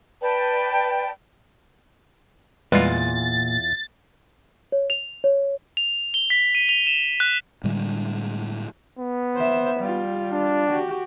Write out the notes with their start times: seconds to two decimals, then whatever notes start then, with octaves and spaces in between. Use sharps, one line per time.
0.21 B4 D5 G5 A5
2.72 E2 A#2 G3 G#3 F4 B4 A6
4.72 C#5
4.90 F7
5.24 C#5
5.77 F7
6.14 G7
6.30 B6
6.55 D#7
6.69 F7
6.87 E7
7.20 F#6
7.64 A2 D3 G3 G#3
8.99 B3
9.36 C5 E5
9.80 G3 F4
10.32 D4
10.70 F#4 G4